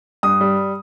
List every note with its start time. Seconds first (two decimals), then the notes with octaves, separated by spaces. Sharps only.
0.23 G2 D#6
0.41 G3